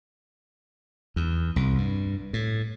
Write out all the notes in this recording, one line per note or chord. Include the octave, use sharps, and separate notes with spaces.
E2
C2
G2
A2